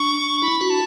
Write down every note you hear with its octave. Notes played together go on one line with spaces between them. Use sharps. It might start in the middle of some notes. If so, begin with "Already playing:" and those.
Already playing: D4 C#6
E4 B5
F#4
A5